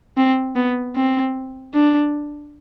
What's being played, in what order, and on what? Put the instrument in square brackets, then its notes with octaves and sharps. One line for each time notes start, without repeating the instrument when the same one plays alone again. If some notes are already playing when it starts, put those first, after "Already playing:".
[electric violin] C4
B3
C4
D4